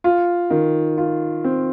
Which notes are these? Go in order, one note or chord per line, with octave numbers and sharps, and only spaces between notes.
F4
D#3
F4
C4